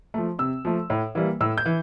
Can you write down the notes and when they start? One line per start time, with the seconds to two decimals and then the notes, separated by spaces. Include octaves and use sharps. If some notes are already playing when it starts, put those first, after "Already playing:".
0.14 F3 A3
0.39 C3 E6
0.65 F3 A3
0.90 A2
1.15 E3 G3 A#3
1.41 A2 E6
1.58 G6
1.65 E3